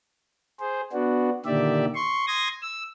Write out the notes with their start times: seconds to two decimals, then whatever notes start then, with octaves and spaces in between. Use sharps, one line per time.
0.60 G#4 C5
0.92 B3 D4 F#4
1.45 A#2 D3 D#3 G4 D5 E5
1.95 C6 C#6
2.27 C6 D#6 G#6 A#6
2.62 E6